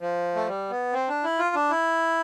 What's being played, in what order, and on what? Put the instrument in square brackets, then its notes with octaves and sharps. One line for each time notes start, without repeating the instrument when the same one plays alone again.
[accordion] F3
A3
G3
B3
C4
D4
E4
F4
D4
E4